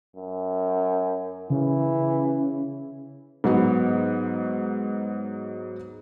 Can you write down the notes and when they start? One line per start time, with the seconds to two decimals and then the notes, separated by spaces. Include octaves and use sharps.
0.16 F#2
1.50 C#3 E3
3.44 G#2 F#3 B3 F#4